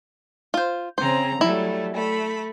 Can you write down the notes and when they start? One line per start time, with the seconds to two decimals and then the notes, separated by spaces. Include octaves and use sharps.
0.54 F4 C5
0.98 C#3 C4 C5 A#5
1.41 F#3 G3 A3 E4
1.94 A3 B5